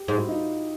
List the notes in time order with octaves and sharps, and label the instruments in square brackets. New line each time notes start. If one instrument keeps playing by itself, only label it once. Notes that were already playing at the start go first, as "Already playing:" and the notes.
Already playing: [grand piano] G4
[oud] G#2
[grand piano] E4 F#4
D#4 F4